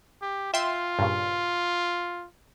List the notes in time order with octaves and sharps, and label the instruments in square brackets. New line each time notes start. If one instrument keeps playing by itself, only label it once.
[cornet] G4
[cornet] F4 [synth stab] E5 G5 C6
[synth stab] G2 A#2 C#3